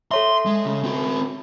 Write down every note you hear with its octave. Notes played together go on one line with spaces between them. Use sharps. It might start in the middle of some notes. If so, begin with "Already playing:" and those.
A4 C#5 E5 C6
G#3
C#3
C4 F#4